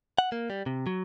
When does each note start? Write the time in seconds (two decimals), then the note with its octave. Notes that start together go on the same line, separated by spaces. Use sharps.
0.18 F#5
0.32 A#3
0.50 G3
0.66 C3
0.87 F#3